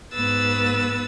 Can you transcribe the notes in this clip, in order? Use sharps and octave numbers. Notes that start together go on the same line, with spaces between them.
G#2 B3 B4 E6 A6